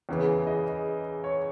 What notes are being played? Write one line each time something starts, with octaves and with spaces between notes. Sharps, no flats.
E2 C#3 E3
D#5
C#5